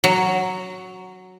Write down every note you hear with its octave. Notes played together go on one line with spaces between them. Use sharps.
F#3